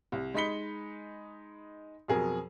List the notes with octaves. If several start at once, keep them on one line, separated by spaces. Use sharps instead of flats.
C2
G#3 D#4 B5 B6 C#7 G7
F2 B2 F#3 G#4 A#4